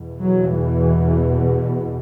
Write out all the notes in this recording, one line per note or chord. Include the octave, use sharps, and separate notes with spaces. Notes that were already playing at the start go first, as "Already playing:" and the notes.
Already playing: E2 B2
F#3
E3